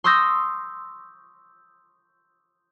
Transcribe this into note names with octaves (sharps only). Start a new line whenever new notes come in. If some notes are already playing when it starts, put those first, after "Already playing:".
C6 C#6 D#6 E6 G6 A#6